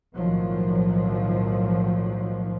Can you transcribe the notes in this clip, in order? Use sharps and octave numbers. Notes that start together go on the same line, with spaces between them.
B1 A2 D#3 F3 F#3